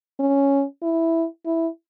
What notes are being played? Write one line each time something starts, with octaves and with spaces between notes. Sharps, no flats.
C#4
E4
E4